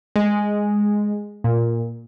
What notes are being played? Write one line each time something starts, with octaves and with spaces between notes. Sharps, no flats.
G#3
A#2